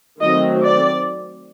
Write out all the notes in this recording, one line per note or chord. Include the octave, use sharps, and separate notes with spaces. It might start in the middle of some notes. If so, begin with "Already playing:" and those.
D#3 F#3 A3 C4 D#5
D5